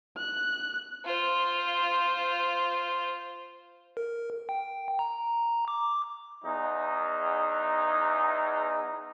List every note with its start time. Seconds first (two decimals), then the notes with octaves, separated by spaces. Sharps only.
0.18 F#6
1.05 F4 C5
3.97 A#4
4.49 G5
4.99 A#5
5.68 D6
6.45 E2 D#4